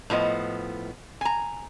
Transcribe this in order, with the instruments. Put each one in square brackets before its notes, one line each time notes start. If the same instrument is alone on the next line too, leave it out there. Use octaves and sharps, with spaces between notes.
[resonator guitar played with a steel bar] A2 F3 B3 D#5
G#5 A#5